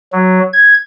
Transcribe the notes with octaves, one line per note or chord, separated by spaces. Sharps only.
F#3
G#6